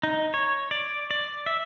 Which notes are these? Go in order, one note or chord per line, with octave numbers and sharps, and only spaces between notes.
D#4
C#5
D5
D5
E5